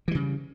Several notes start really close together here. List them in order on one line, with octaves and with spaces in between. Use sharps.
E3 G3 C#3